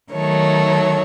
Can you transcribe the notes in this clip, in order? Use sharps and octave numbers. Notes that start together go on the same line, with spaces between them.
D#3 F#3 A3 C#5